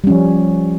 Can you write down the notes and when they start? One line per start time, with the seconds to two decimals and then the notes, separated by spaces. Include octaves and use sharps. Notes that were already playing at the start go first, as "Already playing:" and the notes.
0.04 G3
0.07 C#4
0.10 F3